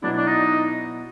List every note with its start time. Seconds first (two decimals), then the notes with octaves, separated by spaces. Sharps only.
0.02 B2 F#3 B3 D4 E4
0.16 D4
0.27 D#4